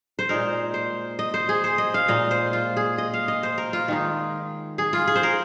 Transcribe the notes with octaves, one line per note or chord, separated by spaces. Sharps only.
C5
A#2 G#3 D#4 A#4
C5
D#5
C5
G#4
C5
D#5
F5
A#2 G#3 D#4 D#5
C5
F4
G#4
D#5
F5
D#5
C5
A#4
F4
D#3 G#3 D#4
G#4
F4
G#4
C5
A#4